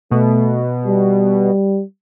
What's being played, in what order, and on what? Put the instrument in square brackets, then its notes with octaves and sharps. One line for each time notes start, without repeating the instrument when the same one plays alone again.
[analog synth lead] B2 [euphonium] A3
[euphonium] G3